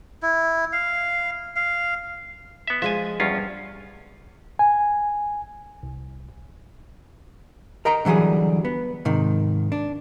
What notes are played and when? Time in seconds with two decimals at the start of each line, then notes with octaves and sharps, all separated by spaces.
0.22 E4
0.73 F5
1.56 F5
2.67 B3 E5
2.82 F3 G#3 D#5 E5 G#5
3.20 E2 G2 C#4 F4
4.59 G#5
5.83 C2
7.85 A#4 D#5 G5 A#5
8.05 D3 E3 F#3 G3 G#4
8.65 B3
9.05 G#2 C3 D#3
9.72 D4